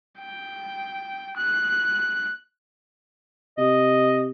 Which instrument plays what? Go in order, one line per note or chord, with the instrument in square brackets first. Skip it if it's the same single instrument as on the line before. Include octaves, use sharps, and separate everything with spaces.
[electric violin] G5
F#6
[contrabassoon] C3 [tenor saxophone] D#5